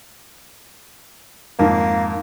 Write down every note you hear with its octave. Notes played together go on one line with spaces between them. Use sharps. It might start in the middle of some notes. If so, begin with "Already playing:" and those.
F2 G#2 D#3 A#3